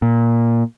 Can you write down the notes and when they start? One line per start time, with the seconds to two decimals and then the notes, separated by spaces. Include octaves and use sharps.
0.02 A#2